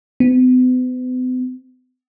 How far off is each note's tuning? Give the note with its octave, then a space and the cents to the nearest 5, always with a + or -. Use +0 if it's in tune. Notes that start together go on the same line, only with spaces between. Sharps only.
B3 +45